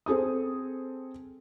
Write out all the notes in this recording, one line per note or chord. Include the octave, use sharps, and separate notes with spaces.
C4 G#4 A4 D#6